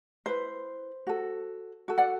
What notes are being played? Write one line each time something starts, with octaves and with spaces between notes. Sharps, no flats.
E4 B4 C5
F#4 A4
F#4 A4
D5 F#5